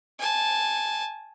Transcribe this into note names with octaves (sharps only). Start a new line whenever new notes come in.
G#5 A5